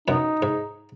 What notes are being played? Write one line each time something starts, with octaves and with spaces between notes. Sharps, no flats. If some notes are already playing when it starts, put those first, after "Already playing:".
F#2 B2 D#4
G#2